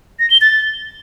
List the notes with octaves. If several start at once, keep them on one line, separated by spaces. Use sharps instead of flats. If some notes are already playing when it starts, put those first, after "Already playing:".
A#6
G7
A6